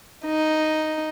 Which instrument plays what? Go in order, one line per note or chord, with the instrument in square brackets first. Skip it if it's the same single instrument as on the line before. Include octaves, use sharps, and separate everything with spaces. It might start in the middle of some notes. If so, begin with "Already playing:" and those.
[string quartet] D#4